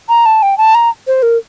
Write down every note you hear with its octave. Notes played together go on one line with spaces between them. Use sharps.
A#5
A5
G5
A5
A#5
C5
A#4